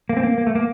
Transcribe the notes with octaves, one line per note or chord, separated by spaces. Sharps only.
A#3
C4
A#3
A#3
A3
A#3